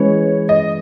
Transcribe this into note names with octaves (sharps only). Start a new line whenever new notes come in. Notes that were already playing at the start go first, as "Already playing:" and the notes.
Already playing: E3 G#3 C#4 G#4 B4 C#5
D#5